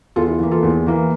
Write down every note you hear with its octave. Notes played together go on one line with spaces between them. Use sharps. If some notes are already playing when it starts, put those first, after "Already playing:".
E2 F4 A4
E4
E3 A#3
F4 A4
E2
E3 A#3